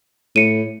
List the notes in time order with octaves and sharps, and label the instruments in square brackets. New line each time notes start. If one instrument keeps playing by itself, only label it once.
[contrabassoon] A2 [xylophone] C#7 D#7